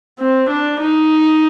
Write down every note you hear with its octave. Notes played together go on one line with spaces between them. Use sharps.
C4
D4
D#4